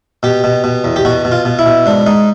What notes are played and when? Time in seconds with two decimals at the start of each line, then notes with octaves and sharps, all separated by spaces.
0.23 B2 G4
0.44 B2
0.64 B2
0.84 E2
0.96 G4
1.05 B2 F#4
1.25 B2
1.32 F4
1.45 B2
1.59 E4
1.66 B2
1.86 G#2 D4
2.06 G#2 D#4